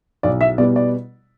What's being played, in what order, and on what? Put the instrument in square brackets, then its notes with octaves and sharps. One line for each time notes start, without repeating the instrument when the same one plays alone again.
[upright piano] B1 D5
E5
B2 G3 B3 D5
D5